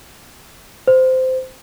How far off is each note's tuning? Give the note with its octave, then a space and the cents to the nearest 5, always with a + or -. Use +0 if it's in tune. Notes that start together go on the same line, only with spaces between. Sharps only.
C5 -15